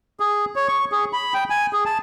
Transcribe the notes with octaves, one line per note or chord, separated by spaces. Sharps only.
G#4
C#5
C#6
G#4
B5
G5
G#5
G#4
A5